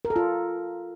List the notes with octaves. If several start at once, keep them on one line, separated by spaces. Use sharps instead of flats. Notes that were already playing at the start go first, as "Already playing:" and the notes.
A#4
A4
F4